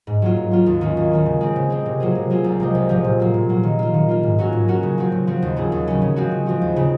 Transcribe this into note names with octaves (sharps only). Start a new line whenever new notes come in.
G#2
F#3 A#3 F4
G#2
F#3 A#3 F4
D#2
D#3 A#3 C#4
D#2
D#3 A#3 C#4
C#3
G#3 C4
C#3
G#3 C4
C3
F#3 A#3 F4 G#4
C3
F#3 A#3 F4 G#4
C2
C3 F3 G#3
C2
C3 F3 G#3
A#2
F#3 A#3
A#2
F#3 A#3
D#3
A#3 F4
D#3
A#3 F4
G#2
F#3 C#4 F#4 A#4
G#2
F#3 C#4 F#4 A#4
C#3
F3 C4 F#4
C#3
F3 C4 F#4
D#2
C#3 F#3 C#4 G#4
D#2
C#3 F#3 C#4 G#4
C#3
F3 G#3 C4 F#4
C#3
F3 G#3 C4 F#4
D#2
C#3 G#3 C4